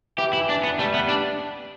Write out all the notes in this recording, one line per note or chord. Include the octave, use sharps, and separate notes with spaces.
E3 G4
E4
D4
B3
G3 A3
B3
D4